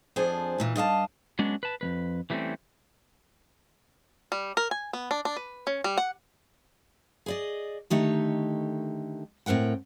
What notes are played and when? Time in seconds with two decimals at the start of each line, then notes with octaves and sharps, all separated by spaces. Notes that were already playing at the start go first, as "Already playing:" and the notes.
0.16 F2 D4 G#4 C5 G#5
0.58 E2 A#2 E3
0.76 G2 D#5 F5 A5
1.39 F#3 G#3 B3 C#4 D4
1.63 B4 A5
1.81 F2 G3 B4
2.30 E3 G3 A3 A#3 C4 C#4
4.32 G3
4.57 A#4
4.71 G#5
4.93 B3
5.11 D4
5.25 D4
5.36 B4
5.67 C#4
5.84 G3
5.97 F#5
7.26 G#4 D5 D#5
7.90 D3 D#3 A3 D#4 G4
9.46 A2 C4 A#4 F#5 G5